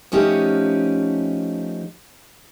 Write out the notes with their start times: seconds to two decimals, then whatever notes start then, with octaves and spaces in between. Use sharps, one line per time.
0.12 F3 A3 C#4 D#4 F#4 G4